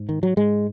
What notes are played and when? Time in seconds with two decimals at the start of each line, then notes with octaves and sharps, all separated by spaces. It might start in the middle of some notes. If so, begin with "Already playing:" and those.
Already playing: G#2
0.09 D#3
0.23 F#3
0.37 G#2 G#3